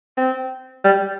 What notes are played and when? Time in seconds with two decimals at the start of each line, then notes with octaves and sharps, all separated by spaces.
0.17 C4
0.84 G3